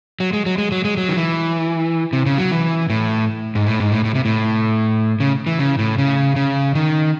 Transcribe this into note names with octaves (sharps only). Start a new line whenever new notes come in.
F#3
G#3
F#3
G#3
F#3
G#3
F#3
D#3
E3
C3
C#3
F#3
E3
A2
G#2
A2
G#2
A2
A2
C3
A2
C#3
E3
C#3
A2
C#3
C#3
D#3